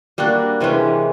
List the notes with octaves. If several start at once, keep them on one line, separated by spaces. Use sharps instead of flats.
G3 A#3 D4 F#4
C3 E3 G#3 C#4